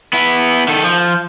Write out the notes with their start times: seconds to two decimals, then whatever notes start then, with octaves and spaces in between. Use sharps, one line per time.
0.13 B3 E4
0.68 D#3 A4
0.84 F3